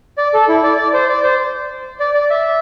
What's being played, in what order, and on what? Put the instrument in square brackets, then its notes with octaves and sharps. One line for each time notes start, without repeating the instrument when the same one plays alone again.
[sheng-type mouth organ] D5
A4
E4
D5
D5
C5
D5
C5
D5
D5
E5